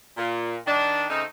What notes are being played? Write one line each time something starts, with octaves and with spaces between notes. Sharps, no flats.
A#2
D#3 D4
C#3 A3 C4 D#4